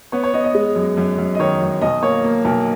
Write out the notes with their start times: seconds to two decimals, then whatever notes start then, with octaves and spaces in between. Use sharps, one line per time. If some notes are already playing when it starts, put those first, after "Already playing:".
0.12 B3 C#5
0.24 C#5
0.34 B3 D#5
0.44 D#5
0.55 G#3
0.75 F#2
0.97 F#2
1.18 F#2
1.35 D#5
1.39 D#3 C#5
1.61 F#2
1.81 B1 D#5
2.03 A#3 C#5
2.24 A#3
2.45 B1